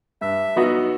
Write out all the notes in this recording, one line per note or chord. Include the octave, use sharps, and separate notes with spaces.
G2 E5
F#3 B3 D#4 F#4